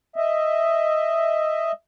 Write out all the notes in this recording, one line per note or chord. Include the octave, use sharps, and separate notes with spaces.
D#5 E5